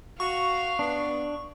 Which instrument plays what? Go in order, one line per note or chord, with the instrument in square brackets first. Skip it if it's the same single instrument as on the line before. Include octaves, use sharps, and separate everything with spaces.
[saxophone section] F#4 [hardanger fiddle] F5 [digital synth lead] C#6
[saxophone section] B3 [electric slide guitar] D4